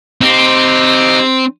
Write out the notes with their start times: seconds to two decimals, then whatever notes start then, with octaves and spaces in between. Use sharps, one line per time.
0.21 C4 D#4 G4